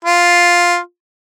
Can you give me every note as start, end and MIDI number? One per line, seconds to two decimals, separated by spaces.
0.05 0.78 65